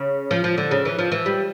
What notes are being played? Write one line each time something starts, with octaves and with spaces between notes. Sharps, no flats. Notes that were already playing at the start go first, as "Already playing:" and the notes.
Already playing: C#3
F3
F3
D3
C#3
E3
F3
E3
G3